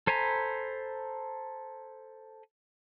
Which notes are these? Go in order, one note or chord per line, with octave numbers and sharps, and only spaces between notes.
A4 C5 G#5 A#5 B5